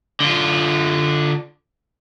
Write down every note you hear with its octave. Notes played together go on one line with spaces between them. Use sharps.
D3 F4